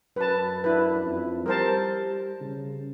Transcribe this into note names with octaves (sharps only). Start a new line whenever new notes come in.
F#2 B4 A5
D4 E4 B4
F2
G3 A#4 C5 A5
C#3